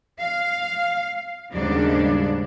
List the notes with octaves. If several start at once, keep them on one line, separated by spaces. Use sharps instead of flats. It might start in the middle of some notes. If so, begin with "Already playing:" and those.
F5
D#2 G#2 C#3 F#3 G3 D4